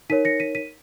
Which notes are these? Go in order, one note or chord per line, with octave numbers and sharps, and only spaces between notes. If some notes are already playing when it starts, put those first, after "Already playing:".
D#4 A#4 C#5 B6 D#7
A#6 C#7
B6 D#7
B6 D#7